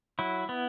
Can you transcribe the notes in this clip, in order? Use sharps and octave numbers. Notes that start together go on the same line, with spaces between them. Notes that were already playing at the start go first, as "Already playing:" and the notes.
F#3 E4
B3